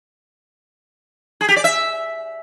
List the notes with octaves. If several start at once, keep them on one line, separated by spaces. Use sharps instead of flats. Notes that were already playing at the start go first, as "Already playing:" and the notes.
G#4
G4
D5
E5